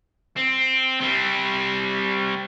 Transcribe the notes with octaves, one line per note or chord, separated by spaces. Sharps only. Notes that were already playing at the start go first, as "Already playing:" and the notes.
C4
G3 C4